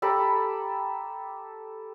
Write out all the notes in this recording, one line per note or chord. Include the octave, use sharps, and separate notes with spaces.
G4 A4 A#5 B5